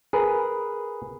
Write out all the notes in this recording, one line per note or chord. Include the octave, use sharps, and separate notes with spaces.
G#4 A#4 B4